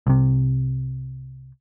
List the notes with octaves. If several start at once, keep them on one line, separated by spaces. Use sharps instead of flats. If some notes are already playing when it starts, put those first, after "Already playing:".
C2 C3